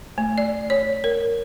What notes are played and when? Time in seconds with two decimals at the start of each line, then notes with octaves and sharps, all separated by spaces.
0.18 A3
0.38 D5
0.70 C#5
1.04 A#4